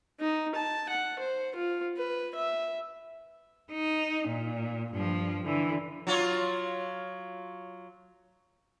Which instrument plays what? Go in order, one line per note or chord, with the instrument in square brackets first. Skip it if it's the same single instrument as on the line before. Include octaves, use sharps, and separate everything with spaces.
[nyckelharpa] D#4
A5
F#5
C5
F4
B4
E5
[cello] D#4
A#2
G2 F3
D3 E3
[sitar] F#3 F4 C#5